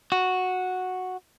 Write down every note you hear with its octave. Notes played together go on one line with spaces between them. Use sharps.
F#4